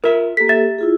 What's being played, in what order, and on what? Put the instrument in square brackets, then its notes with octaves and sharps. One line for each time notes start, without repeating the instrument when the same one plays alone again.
[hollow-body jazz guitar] F4 E5 [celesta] A#4
[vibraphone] A#3 G4 A4 [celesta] B6
[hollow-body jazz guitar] E5 [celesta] A6
[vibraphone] E4 F4 G#4